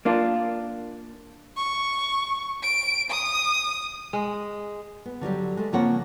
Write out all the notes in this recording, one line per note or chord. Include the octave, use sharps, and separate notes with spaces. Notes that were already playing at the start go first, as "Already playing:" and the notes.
A#3 D4 F4
C#6
D7
D#6
G#3
B3
D3 F#3 G3 G4
G#3 A3
C#3 F3 A#3 C4 C#5 F#5